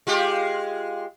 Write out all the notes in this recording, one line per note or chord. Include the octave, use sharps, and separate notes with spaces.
G#3 F4 G4